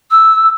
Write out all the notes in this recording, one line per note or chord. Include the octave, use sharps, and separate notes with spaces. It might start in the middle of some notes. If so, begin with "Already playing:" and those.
E6